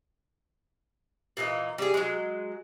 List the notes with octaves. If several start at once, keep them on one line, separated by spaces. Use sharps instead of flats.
A#2 E3 A#3 D#5
G3 G#4
F#3 G#3